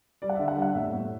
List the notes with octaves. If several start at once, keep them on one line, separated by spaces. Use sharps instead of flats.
G3 D5
F#5
D3 E5
F#5
G3
F#5
A2 E5
A2